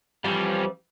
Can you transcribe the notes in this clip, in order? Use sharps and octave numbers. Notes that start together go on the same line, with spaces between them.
F2 E3 F3 G3 C#4